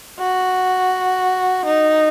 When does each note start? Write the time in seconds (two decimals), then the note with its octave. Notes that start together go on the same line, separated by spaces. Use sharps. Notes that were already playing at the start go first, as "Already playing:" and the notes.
0.20 F#4
1.65 D#4